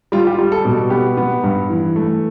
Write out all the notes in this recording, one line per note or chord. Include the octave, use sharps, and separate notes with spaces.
G3 F4
G4
F4
G3
A4
B2
A4
B3 G4
B3
G2
E3
A3